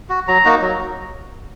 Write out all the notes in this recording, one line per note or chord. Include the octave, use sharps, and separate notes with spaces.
F#4
F#3 A#5
A#3 D#4 F#4
F#3